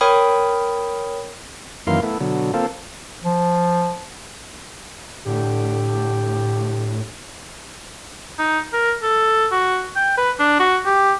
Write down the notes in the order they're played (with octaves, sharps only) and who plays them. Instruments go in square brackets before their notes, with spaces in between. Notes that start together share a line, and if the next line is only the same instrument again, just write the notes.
[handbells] A#4 C#5 G5 B5 D#6
[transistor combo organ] F#2 D#3 E3 A#3 F5 C6
A3 B3 E4
B2 D3 F#3
A#3 C4 F4 A4
[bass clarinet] F3
[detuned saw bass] A2 [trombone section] D3 G4
[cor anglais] D#4
A#4
A4
F#4
G5
B4
D4
F#4
G4